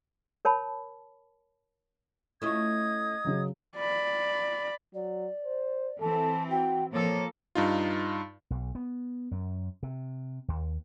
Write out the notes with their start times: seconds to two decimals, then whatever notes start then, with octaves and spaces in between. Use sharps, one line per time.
0.45 A#4 C#5 A5 B5
2.42 A3 C#4 E4 F4 D#5 D#6 G#6
3.25 C#3 F#3
3.76 D5 B5
4.94 F#3 D5
5.44 C5
6.00 E3 C4 A4 A5
6.50 F#4 G5
6.93 A#2 F3 A#3 A4 C#5
7.55 G2 D#4 F4
8.50 B1
8.75 B3
9.31 F#2
9.83 C3
10.48 D#2